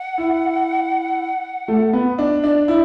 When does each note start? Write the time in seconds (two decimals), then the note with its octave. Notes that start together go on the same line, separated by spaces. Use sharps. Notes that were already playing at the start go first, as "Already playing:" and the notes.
Already playing: F#5
0.18 E4
1.68 A3
1.93 B3
2.18 D4
2.44 D4 D5
2.68 E4